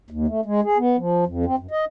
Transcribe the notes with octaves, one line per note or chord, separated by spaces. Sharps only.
D#2
A3
G#3
G#4
B3
F3
F2
C4
F#2
D#5